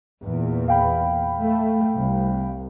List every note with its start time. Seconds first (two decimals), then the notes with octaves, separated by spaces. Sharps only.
0.24 E2 A#2
0.68 F5 G5 B5
1.42 A3
1.95 C2